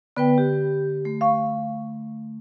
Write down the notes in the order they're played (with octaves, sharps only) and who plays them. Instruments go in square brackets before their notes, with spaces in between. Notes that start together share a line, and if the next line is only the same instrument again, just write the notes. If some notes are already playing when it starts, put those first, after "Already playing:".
[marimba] D3 [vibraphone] B3 B4 G5
[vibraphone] G4
A3
[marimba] F5 C#6